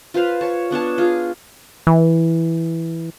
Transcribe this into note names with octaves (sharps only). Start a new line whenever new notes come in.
F4 B4 C5 F5
C#5 A5
B3 D4 C#5 A5
F4 G#4
E3